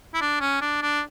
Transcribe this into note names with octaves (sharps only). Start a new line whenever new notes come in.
E4
D4
C#4
D4
D4